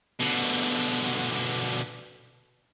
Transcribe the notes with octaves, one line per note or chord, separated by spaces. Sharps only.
B2 D3